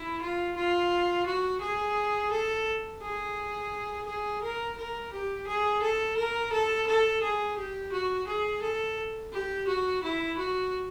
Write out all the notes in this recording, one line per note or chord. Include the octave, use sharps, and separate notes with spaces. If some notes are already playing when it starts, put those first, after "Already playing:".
Already playing: E4
F4
F4
F#4
G#4
A4
G#4
G#4
A#4
A#4
G4
G#4
A4
A#4
A4
A4
G#4
G4
F#4
G#4
A4
G4
F#4
E4
F#4